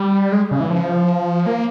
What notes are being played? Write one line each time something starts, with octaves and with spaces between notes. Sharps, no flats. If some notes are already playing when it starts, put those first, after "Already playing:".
Already playing: G3
G#3
C#3
E3
F3
A#3